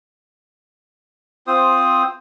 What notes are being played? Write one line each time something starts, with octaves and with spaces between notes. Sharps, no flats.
C4 F4 C5 D#6